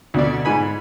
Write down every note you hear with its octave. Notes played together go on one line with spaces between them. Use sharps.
D2 B2 D5
G#2 G#5 B5